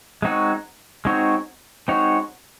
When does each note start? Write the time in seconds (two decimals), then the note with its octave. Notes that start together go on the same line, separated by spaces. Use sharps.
0.22 G#3 C4 D#4 F#4 C#5
1.05 G#3 C4 D#4 F#4 C#5
1.88 G#3 C4 D#4 F#4 C#5